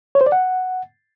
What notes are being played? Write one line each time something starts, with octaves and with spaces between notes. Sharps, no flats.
C#5
C5
D5
F#5